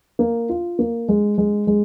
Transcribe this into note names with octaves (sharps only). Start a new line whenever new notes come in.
A#3
F4
A#3
G#3
G#3
G#3